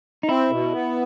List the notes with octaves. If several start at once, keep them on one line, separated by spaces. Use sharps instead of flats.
D#4
C4 E4
B2
B3